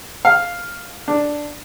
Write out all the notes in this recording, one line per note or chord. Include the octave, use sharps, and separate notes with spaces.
F5
D4